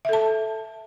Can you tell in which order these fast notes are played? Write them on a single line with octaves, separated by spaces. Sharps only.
E5 A4 A5